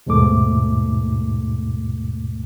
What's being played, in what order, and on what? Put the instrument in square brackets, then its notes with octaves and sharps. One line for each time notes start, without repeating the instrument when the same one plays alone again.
[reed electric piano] D#2 G#2 B2 A3 D6